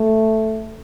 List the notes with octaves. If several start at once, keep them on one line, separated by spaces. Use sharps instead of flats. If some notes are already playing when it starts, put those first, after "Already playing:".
Already playing: A3